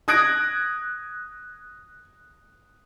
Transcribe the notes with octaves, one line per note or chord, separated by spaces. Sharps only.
D#6 F#6 G#6 A#6 D7